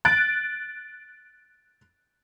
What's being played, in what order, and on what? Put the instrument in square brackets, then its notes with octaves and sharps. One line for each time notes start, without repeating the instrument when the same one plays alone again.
[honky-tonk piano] F#6 A6 D7